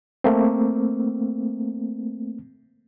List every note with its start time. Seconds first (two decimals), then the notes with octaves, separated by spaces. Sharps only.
0.24 A3 A#3 C4